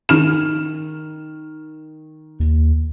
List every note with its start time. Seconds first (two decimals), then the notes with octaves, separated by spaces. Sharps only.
0.09 D#3 F6 E7
2.40 D#2